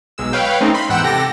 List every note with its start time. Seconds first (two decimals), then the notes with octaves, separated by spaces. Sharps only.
0.18 B1 G#3 E6
0.33 B4 C#5 F5 G5
0.61 A3 C4 C#4 D#4
0.74 B5 C6
0.89 E2 G#2 F#5 G5 E6 E7
1.04 C3 G4 A4 A#6